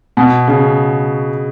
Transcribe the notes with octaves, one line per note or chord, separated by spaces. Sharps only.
B2
C#3